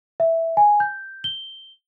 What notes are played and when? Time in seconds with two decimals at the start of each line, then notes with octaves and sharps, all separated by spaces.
0.20 E5
0.57 G#5
0.80 G6
1.24 G7